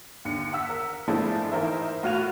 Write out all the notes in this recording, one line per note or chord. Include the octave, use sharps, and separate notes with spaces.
D#2 D3 C#7
F#5 E6 B6
A#4
F3 G#3 A3 D4 E4 G#4
E3 D#4 A#4 C5 E5
A2 F4 F#4 G#6 F7